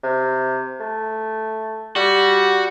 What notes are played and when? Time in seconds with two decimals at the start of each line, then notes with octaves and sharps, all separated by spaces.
0.03 C3
0.80 A3
1.96 G3 F#4